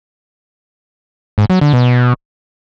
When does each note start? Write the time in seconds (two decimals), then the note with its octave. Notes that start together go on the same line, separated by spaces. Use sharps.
1.38 G#2
1.50 F#3
1.61 D3
1.73 B2